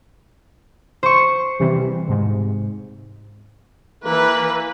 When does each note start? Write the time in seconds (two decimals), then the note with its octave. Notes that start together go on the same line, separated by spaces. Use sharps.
1.03 C5 C#6
1.60 C3 E3 G3
2.08 G#2 C3
4.06 E3 A#3 B4